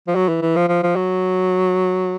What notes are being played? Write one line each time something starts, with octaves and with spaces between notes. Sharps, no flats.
F3
F#3
E3
E3
F3
F3
F3
F#3